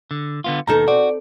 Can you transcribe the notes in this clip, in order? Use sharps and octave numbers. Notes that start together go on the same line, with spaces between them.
D3
D3 B3 F4
D#2 B2 D#3 D#4 A4 A#5
C4 F#4 D5